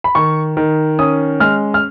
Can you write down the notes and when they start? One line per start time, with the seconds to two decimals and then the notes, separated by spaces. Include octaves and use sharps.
0.04 B5
0.15 D#3 C#6
0.57 D#3
0.99 C#4 D#6
1.40 G#3 F6
1.74 F6